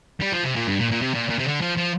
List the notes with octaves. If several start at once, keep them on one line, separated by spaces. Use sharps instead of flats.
G3
F3
C3
A#2
G2
A#2
A#2
C3
A#2
A#2
C3
D3
F3
F3